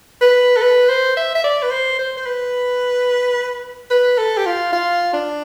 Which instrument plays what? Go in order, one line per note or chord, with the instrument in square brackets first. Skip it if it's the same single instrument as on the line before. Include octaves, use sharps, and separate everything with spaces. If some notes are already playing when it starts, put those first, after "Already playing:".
[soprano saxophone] B4
A4
B4
C5
E5
E5
D5
B4
C5
C5
C5
B4
B4
A4
G4
F4
F4
D4